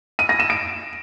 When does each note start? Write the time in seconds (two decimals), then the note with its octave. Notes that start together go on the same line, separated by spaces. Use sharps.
0.19 D#7
0.29 A#6
0.40 E7
0.50 D7